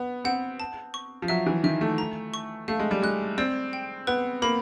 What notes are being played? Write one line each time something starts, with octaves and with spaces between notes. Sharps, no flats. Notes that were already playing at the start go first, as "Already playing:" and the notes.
Already playing: B3
C4 F#5
A5
C#6
F3
F#3 E5
E3
D#3 E5
A3
A#5
C#6
A3 F5
G#3
G3
G#3 F#6
C4 D5
G5
B3 B4
A#3 B5